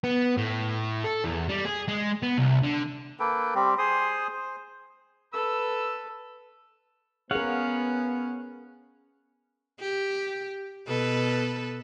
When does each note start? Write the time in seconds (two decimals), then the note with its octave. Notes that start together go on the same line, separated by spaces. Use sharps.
0.04 B3
0.37 A2
1.04 A4
1.25 E2
1.49 G3
1.65 G#4
1.88 G#3
2.23 B3
2.38 C2
2.63 D3
3.20 A#3 A4 B4 G5
3.55 G3 C4 G4
3.78 G#4 C5 C6 D#6
4.33 C5
5.33 A4 B4 E6
7.31 B3 C#4 G#4 A#4 C#5 F5 F#5
9.80 G4
10.87 B2 A4 B4